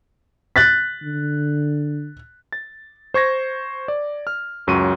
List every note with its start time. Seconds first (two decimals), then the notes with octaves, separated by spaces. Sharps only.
0.56 F#6 A6 B6
1.02 D3
2.52 A6
3.14 C5 C#6 G#6 A#6
3.88 D5
4.27 F6
4.67 C#2 F#2 F#3 C#6 D#7